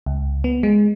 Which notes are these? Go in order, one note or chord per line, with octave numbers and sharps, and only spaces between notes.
C#2
B3
G#3